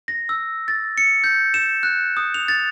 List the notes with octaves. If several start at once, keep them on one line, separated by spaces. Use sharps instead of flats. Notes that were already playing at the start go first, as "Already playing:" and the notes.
A#6
E6
A6
C#7
G6
E7
F#6
D#6
F7
A6